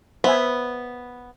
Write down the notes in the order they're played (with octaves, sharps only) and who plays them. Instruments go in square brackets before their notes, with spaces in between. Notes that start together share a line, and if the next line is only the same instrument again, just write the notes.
[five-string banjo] B3 [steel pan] C5 E5 G#5